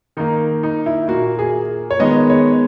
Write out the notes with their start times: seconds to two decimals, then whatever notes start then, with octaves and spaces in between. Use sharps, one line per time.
0.17 D#3 A#3 D#4
0.63 D#4
0.86 E4
1.08 A#2 A#3 F#4
1.39 G#4
1.91 C#5
2.00 D#3 G#3 B3 D#5
2.30 C#5